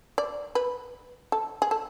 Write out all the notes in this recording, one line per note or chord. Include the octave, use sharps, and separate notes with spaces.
D5
B4
A4
G#4
A4